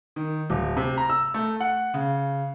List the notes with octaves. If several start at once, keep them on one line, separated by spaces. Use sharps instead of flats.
D#3
D1
C3
A#5
E6
A3
F#5
C#3